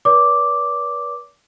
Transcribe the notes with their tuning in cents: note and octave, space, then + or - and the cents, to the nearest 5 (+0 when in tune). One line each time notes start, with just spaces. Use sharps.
B4 -35 D5 -45 D6 +0